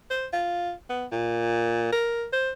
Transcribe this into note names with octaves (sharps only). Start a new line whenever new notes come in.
C5
F4
B3
A#2
A#4
C5